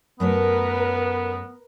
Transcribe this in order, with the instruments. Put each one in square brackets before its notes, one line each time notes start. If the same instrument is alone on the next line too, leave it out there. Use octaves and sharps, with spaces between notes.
[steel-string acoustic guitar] F#2 A3 C#5 [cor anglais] B3 [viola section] A#4 B4